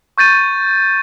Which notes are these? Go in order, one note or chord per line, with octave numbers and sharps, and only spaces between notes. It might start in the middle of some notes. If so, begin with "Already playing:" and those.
C#6 G6 A6 D#7